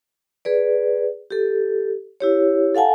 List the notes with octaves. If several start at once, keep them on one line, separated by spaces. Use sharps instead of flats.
G#4 B4 D5
G4 A4
E4 G4 C#5
A4 F5 F#5 G#5 A5